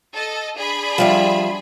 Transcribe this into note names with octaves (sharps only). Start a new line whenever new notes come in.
A4 D#5
D4 G#4 B5
F3 G3 E5